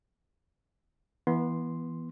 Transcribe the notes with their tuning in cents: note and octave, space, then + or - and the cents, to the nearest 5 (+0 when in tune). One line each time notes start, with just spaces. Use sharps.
E3 +0 B3 -25 C6 +0